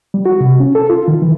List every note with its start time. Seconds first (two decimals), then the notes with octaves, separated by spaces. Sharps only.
0.14 G3
0.26 F#4
0.40 C3
0.60 C#4
0.75 A4
0.90 F4
1.08 D#3
1.22 E3